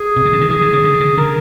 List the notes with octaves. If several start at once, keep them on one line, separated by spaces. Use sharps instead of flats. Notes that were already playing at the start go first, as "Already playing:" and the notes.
Already playing: G#4
C3
C#3
D3
D#3
E3 G#4
D3
C#3
D3
C#3
D3 A#4